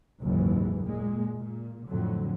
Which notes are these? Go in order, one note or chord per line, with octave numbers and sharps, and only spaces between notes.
F#1 D#2 G#2 E3
A#2 G#3
A#2
F2 A2 D3 F#3